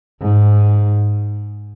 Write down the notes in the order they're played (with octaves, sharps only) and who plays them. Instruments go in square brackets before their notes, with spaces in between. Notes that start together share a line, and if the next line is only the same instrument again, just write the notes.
[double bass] G#2